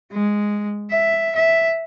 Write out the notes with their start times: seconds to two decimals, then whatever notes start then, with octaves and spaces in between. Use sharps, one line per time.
0.11 G#3
0.91 E5
1.35 E5